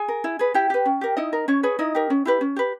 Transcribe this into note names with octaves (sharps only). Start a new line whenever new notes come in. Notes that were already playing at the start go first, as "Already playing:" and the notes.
Already playing: G#4 G#5
A#4
E4
G#4 B4
E4 G4 G5
G4 B4
C#4
G4 A#4
D#4 E4 D#5
A#4
C#4 C#5
G#4 B4 C#5
D#4 E4 D#5
G4 A#4
C#4
E4 G4 B4
C#4
G4 B4